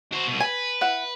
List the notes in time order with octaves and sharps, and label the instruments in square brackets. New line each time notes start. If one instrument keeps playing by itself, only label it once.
[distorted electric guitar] F#4 C5
C2 B2
[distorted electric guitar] B4 [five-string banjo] G#5
[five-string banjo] E4 F#5